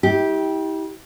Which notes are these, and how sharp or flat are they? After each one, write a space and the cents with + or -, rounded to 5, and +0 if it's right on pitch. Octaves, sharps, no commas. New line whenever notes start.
E4 -40 G4 +0